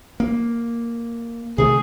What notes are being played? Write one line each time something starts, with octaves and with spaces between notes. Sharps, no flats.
A#3
C3 D#3 A3 G#4